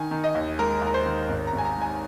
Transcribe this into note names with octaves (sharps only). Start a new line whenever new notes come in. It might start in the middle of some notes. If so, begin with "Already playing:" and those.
Already playing: D#3 G#5
D#3
D#5
D#2
G#3 A#4
D#2
A#4
C5
D#3
G#1
A#5
G#1
G#5
A#5
G#2
G#5